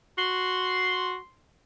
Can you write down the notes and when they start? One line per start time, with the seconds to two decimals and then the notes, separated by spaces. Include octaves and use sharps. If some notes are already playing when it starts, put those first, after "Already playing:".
0.18 F#4 C6